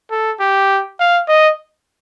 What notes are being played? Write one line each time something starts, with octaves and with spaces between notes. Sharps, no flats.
A4
G4
F5
D#5